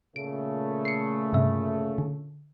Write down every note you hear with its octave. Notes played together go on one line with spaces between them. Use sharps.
A#2 C#3 A3 D7
C7 C#7
G2 C3 E5
D3